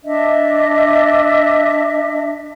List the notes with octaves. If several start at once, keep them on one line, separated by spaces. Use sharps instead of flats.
D4 D#5 E5